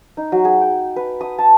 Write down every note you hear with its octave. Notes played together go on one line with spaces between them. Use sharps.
D#4
F#3
G#4
G5
B4
D#6
A5